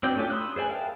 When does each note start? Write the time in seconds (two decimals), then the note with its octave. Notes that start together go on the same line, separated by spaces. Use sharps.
0.03 C4 D4 F#4 D5 G5
0.16 A3 C#4 D4 F4 G4
0.30 B5 C6 D#6 E6 F#6
0.56 G#4 C5 D5 G#5
0.69 A#4 E5 F5 G5 A5